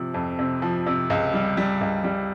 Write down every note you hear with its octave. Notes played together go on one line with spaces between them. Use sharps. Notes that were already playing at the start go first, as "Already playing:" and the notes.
Already playing: C3 F3
F2
C3
F3
C3
C#2
G3
G3
C#2
G3